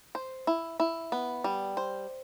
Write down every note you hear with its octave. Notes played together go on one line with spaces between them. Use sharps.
C5
E4
E4
B3
G3
C5